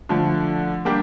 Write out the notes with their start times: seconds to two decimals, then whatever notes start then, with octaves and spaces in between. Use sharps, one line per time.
0.09 D3 F3 A3
0.85 G3 A#3 D4 G4